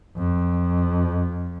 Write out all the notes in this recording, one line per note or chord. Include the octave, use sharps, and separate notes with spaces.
F2